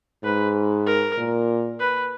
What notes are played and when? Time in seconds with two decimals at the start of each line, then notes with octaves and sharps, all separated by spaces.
0.24 G#2 B4
0.86 A#4
1.18 A#2
1.80 B4